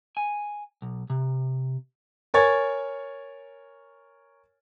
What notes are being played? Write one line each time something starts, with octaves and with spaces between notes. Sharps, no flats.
G#5
B1
C3
A#4 C#5 G#5 C#6 G#6 A6